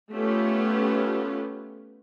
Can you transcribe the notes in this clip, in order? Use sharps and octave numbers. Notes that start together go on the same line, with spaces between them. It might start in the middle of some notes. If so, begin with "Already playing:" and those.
A3 B3 C#4 F4 G4